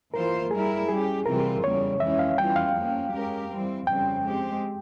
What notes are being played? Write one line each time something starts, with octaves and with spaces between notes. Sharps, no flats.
E3 A#3 F4 A#4 C5
G3 A#3 E4 G#4 A#4
G3 C#4 G4 G#4
C3 E3 G3 C4 F4 A#4
E2 C#3 G3 A#3 C#5
F2 E3 G#3 C#4 E5
F5
E2 E3 G3 C#4 F4 G5
F5
F3 A#3 C#4
G#3 C#4 G4 A#4
E3 G3 C4
F2 C#3 G3 C4 G5
G#3 C4 G4